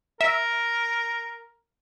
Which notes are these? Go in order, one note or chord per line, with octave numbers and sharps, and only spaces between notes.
A#4 E5